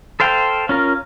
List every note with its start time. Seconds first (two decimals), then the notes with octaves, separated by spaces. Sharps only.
0.20 A4 C5 F5 G5
0.69 C#4 F4 A#4